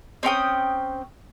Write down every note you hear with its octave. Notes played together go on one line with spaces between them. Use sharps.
C4 C#4 G5 D#6